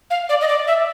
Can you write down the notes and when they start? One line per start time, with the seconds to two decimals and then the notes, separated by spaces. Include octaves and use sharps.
0.10 F5
0.29 D5
0.41 D#5
0.48 D5
0.67 E5